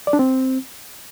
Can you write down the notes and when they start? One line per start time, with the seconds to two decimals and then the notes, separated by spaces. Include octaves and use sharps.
0.07 D5
0.13 D4
0.19 C4